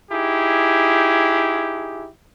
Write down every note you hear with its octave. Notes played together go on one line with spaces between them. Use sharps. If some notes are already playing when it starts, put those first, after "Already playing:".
D#4 E4 G4 G#4